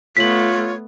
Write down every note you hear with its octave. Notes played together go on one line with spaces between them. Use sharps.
A3 B3 F4 C#5 B6 F#7